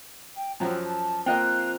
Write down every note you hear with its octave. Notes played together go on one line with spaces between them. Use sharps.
G5
F#2 F3 F#3 G5
A5
A#3 C4 F4 D#5 G5 F#6